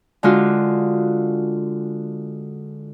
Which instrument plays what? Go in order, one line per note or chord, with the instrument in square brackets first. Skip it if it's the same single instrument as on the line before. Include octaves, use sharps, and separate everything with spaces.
[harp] D3 G#3 F4 F#4